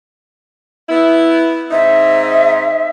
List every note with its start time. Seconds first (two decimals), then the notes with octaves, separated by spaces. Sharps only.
0.89 B3 E4
1.71 G#2 C4 D#4 E5